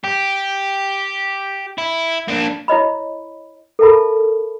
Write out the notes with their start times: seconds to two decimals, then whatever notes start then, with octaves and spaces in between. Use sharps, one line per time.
0.04 G4
1.78 E4
2.28 A#3 D4
2.68 E4 C#5 D#5 B5
3.79 A4 A#4 E5 A5 B5